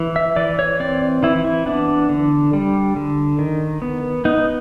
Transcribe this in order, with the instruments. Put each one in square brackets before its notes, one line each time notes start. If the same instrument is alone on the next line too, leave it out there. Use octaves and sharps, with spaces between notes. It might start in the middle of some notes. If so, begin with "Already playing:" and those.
Already playing: [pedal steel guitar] E3
E5
E3 D5
C#5
C4 D5
E3 E4
E4
B3 D4
D3
G3
D3
D#3
B3
B3 D#4